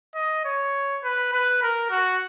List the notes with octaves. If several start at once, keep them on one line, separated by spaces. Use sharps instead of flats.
D#5
C#5
B4
B4
A#4
F#4